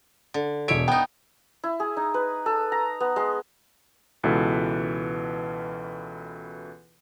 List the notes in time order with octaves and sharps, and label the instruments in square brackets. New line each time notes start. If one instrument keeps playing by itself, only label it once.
[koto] D3
[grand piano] E1 D7 [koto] C#5 E5
[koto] B3 D#4 [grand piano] G5
[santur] E4
G#4
D#4
B4
A4
A#5
B3
G#3
[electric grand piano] C#2 B2 E3 A4 B4